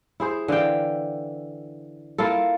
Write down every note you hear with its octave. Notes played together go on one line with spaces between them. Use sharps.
E4 G#4 C5
D3 E3 F5 G5
A#3 E4 F4 A4